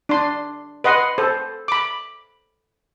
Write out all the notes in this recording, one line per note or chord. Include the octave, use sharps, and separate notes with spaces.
D4 C6
B4 D#5 F#5 C6
A4 C5
B5 D6